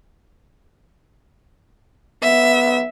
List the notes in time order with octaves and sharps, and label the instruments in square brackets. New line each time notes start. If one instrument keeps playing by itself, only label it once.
[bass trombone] B3 [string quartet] E5